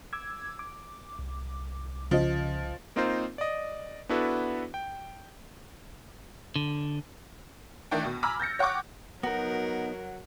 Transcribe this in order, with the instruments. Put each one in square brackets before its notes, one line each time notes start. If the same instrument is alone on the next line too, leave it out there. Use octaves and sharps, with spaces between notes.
[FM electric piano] D6 E6 G#6
D6
[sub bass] C2
[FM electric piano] C#3 D#5 [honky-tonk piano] F3
[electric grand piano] A#3 C4 D#4 F4 A#4 C5
D5 D#5
B3 D4 E4 F#4 A4 B4
G5
[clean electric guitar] D3
[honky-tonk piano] D#3 E3 A3 D4 G5
B2
G#5 A#5 B5 D6 E6 F6
G6 A6 A#6 C#7
C#5 F#5 G5 C#6 D6
[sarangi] F#3 [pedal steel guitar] B3 D#4 [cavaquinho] F#4 [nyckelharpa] A#4